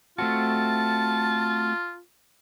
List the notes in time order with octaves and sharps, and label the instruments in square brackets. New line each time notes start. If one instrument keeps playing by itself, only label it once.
[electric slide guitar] A3 C4 F#4 [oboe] F4 [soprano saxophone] A5